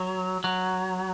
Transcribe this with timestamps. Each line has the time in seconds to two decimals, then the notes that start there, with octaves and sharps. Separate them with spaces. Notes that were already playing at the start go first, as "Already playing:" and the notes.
Already playing: F#3
0.44 F#3